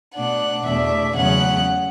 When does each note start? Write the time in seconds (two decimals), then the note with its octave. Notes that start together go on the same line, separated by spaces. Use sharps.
0.15 B2 A3 D4 F#5
0.65 E2 B2 A3 D4 E5
1.16 E2 C#3 F#3 A3 C#4 F#5